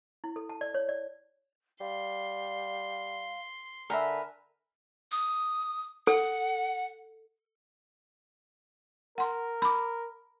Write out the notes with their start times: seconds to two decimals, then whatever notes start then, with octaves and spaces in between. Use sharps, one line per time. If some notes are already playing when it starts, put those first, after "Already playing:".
0.24 E4
0.36 A4
0.49 A5
0.61 D5
0.74 C#5
0.89 D5
1.81 G3 F5 C6
3.90 D3 A#4 B4 E5 G#5
5.12 D#6
6.07 A4 F#5
9.18 A#4 F#5 C6
9.62 B5 D6